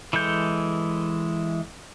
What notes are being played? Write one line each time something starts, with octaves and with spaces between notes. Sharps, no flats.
E3 G#3 A4 G6